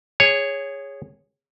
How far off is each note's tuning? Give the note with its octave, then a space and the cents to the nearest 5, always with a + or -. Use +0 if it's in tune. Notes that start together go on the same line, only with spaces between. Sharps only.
G#4 -15 C#5 +0